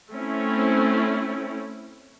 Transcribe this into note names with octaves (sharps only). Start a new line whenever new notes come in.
A3 C4 C#4 E4